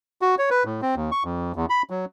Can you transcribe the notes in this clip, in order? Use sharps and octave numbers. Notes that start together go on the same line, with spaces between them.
F#4
C#5
B4
A2
C4
D#2
C#6
F2
E2
B5
F#3